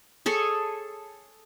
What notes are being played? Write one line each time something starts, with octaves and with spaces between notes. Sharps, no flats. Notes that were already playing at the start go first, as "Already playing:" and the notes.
G#4 A4 C#5